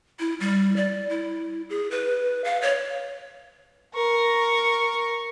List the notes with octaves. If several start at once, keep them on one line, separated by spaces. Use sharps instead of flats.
E4
G3
D5
E4
G#4
B4
F5
C#5
A#4 C#6